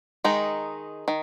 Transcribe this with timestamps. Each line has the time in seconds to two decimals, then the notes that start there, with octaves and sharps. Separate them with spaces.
0.24 D#3 G#3 D#4
1.08 D#3